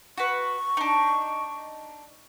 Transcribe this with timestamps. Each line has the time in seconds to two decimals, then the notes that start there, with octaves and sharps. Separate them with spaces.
0.17 F#4 B4 C#6
0.77 D4 D#4